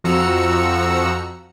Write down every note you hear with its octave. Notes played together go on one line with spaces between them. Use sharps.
F2 F3 F#4 A#5 E6 C#7